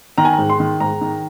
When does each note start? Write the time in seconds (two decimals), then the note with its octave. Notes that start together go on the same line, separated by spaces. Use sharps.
0.18 D#3 A#5
0.25 G#5
0.33 A#5
0.38 G#2
0.50 C6
0.60 D#3
0.80 G#2 A#5
1.01 D#3